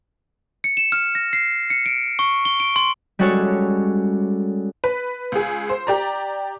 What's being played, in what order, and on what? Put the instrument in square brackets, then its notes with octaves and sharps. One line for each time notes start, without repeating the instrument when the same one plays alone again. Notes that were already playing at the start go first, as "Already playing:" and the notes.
[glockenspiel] C#7
E7
F6
A#6
C7
C#7
D7
C#6
G7
D7
C6
[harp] G3 G#3 C#4 F#4 A4 C#5
[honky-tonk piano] B4
C#2 G#4
C5
G4 D5 A#5